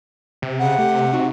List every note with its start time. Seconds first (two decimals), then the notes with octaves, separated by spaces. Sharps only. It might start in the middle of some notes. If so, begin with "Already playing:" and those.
0.42 C3
0.59 C#3 F#5
0.79 A3 G4
1.13 C4 D#4 F#4